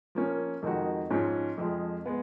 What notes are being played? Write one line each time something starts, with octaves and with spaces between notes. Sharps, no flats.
F3 A#3 C#4
F2 D#3 G#3 D#4 F#4
G#2 F3 G#3 C#4 F4
F2 F3 G#3
G#3 B3